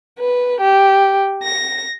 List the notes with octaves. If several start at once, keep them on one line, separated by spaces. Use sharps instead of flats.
B4
G4
A#6